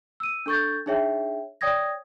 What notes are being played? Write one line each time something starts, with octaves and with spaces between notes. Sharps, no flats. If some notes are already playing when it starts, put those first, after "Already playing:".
E6 D#7
D4 A4 C#6 G6 A6
D4 D#4 G#4 C#5 E5 G5
C#5 D5 G5 D#6 G#6 A#6